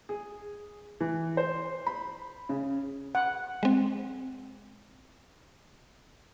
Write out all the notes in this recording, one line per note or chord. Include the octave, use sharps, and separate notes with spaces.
G#4
E3
C5
B5
C#3
F#5
G#3 C4